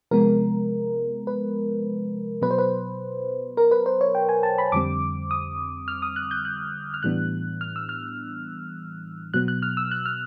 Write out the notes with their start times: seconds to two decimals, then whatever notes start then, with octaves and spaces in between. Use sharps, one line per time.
0.11 C3 F3 G#3 B3 A#4
1.27 B4
2.42 B2 F#3 B3 B4
2.51 C5
2.58 B4
3.57 A#4
3.71 B4
3.86 C5
4.01 C#5
4.15 G5
4.29 G#5
4.43 A5
4.58 B5
4.72 F2 D3 G3 C4 D6
5.31 D#6
5.88 F6
6.02 D#6
6.16 F#6
6.31 G6
6.45 F#6
6.94 F6
7.03 A2 E3 G3 B3 D4 F#6
7.61 F6
7.76 E6
7.89 F6
9.34 B2 F#3 B3 F#6
9.48 F#6
9.62 F6
9.77 E6
9.91 F#6
10.06 F6